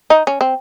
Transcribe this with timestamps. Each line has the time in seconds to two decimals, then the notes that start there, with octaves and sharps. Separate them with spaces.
0.10 D#4
0.27 C#4
0.41 C4